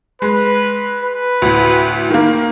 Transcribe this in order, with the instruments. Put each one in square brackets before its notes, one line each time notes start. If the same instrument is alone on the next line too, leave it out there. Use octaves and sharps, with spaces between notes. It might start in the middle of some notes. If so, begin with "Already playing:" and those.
[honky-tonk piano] G#3 [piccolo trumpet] B4
[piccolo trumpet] B4
[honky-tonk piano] D2 A2
D#3 A#3